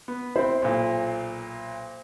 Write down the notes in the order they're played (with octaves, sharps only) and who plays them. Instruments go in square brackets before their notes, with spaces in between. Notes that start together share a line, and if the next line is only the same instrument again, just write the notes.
[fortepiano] B3
[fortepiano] C4 E4 B5 [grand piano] C5
[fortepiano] B1 A#2